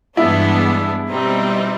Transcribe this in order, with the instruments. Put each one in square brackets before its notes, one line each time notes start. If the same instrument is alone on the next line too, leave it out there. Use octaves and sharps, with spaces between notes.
[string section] G2 E3 G#3 B3 D4 [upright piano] E4
[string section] B2 G3 C4 D#4